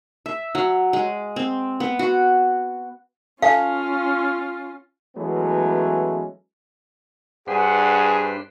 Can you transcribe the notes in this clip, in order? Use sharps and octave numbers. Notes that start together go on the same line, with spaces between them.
E5
F#3
G#3
C4
B3
F#4
C#4 F4 A4 F5 G#5 A5
E3 F#3 G#3 A3 B3 C#4
G2 D4 G#4 B4 C5 F#5